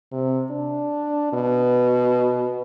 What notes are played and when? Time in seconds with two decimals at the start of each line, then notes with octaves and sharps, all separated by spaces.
0.13 C3
0.51 D4
1.33 B2